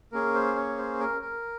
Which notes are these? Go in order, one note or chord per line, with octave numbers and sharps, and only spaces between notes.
A#3 C#4 G#4 A#4
C5
C#5
C5
A#4
A#4